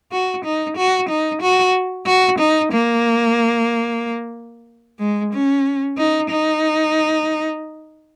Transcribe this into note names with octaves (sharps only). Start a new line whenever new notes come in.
F#4
D#4
F#4
D#4
F#4
F#4
D#4
A#3
G#3
C#4
D#4
D#4